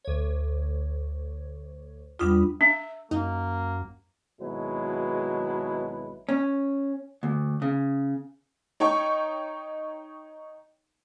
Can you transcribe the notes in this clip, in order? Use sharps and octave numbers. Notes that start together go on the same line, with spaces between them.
D2 C#5
E2 G3 D4 F4 B5 D#6
D4 E5
F#2 A#3 D#4
G#1 B2 F#3 G#3 E4 B4
C#4
D2
C#3
D#4 C#5 G5 C#6